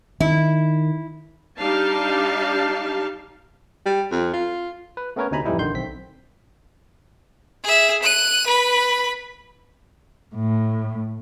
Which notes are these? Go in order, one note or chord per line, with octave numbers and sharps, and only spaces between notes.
D#3 E4
G3 D4 D#4 G4 F5 A5
G3
F2
F4
B4
A3 B3 C#4 A#4 B4 C#5
D2 C3 D#4 G#5 A#5 B5
F2 A2 E3 G3 D#4 E4
A#1 D3 D#3 C6 G6
B1 C4 B6
G#4 E5
F#6 D#7
B4 B5
A2